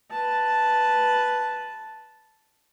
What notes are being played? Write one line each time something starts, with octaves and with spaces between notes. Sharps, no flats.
B4 A5